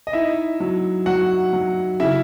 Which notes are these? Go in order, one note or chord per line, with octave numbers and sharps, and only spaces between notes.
D#5
D#4 E4 E5
F#3
F#3 F#4 F#5
F#3
C#3 E4 E5